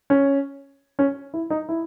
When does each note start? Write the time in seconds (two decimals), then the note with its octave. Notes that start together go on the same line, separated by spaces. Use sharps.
0.10 C#4
0.99 C#4
1.34 E4
1.50 D#4
1.69 E4